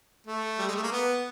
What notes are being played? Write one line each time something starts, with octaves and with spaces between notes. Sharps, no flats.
A3
G3
G#3
A3
A#3
B3